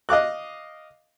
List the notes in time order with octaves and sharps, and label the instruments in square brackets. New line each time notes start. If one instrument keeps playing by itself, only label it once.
[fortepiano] D#5 F5 D6 F#6